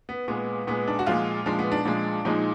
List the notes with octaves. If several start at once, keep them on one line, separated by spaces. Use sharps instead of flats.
B3
A#2 G#3 B3
A#2 G#3 B3
D4
F#4
A#2 F3 G#3 F4
A#2 F3 G#3 D4
B3
D4
A#2 F3 G#3
A#2 F3 G#3 D#4